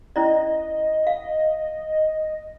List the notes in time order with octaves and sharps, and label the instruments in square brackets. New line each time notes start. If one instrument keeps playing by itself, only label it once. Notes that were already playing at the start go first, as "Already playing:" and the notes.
[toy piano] C#4 E4 D5 [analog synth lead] D#5
[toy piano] F5